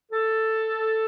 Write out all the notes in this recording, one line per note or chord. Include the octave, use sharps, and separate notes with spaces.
A4